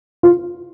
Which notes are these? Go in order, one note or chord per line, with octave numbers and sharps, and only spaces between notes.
F4